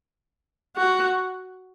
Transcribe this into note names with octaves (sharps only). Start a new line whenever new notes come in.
F#4